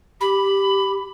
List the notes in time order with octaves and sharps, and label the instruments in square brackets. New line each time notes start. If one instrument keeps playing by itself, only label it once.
[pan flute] G4 [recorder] B5